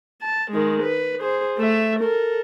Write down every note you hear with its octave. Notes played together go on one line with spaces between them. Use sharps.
A5
D#3 G#3
B4
G#4 C5
A3 E5
A4 A#4